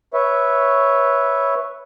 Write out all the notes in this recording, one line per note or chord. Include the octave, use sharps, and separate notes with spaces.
B4 C#5 E5